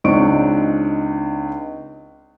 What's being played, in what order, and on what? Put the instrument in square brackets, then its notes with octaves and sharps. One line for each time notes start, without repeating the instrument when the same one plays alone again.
[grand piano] C#2 C4 D4 D#4 C#6 D7